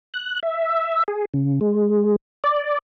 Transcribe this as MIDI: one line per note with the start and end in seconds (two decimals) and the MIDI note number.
0.14 0.39 90
0.43 1.03 76
1.08 1.25 68
1.34 1.59 49
1.61 2.16 56
2.44 2.78 74